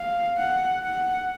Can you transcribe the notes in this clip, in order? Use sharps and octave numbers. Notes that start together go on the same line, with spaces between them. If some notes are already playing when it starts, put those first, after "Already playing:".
Already playing: F5
F#5
F#5